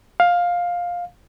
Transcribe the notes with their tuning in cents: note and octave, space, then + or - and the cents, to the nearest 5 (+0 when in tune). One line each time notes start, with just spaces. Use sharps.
F5 +10